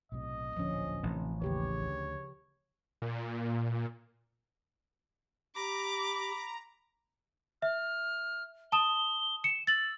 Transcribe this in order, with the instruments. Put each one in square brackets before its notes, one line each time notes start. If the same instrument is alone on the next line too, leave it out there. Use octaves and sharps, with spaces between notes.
[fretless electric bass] B1 A2 C3 [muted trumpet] D#5
[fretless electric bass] D1 A#1 D3 [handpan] F3 C#4
[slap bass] A1 [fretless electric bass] C3 D#3
[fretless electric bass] D#2 [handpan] C#3 G4 B4 [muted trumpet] C#5
[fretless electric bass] D2
[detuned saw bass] A#2
[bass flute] G4 [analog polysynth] A#5 [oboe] B5 [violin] D6
[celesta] E5 [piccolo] F6
[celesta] A5 D#6 E7 [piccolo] G7
[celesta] C#7 [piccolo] E7
[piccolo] E6 [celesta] A6 F#7